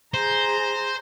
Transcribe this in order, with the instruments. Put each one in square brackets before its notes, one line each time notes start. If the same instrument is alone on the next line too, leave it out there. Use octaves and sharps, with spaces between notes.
[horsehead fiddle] G#4 A#5 [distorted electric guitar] C5